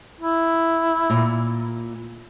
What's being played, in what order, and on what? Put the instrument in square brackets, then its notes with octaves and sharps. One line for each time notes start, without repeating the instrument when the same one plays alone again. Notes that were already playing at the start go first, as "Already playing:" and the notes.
[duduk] E4
[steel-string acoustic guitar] A#2